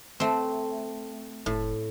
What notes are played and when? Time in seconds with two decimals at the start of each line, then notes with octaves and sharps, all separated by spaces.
0.20 A3 C4
1.46 F1 A2